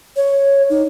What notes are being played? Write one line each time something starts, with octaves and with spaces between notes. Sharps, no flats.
C#5
D#4